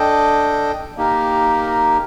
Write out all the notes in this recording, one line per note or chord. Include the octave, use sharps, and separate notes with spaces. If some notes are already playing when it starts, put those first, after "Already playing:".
Already playing: D4 A4 D#5 G5
A#3 D#4 G4 A#4